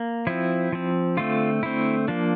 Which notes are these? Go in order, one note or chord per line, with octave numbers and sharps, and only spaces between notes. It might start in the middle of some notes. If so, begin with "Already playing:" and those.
Already playing: A#3
F3 C4 E4
F3 C4
D3 A3 C4 F4
D3 A3 C4 E4
F3 A#3 D4